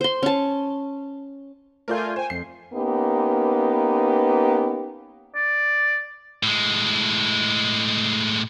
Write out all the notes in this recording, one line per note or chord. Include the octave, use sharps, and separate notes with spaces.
C5 C6
C#4 A5
A3 F4 A#4 D5 G#5 G6
C5 G5 G#5
F2 C7
A#3 B3 C#4 D#4 G4 B4
D5
A2 G#3